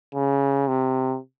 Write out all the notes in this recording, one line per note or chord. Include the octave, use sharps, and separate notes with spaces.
C#3
C3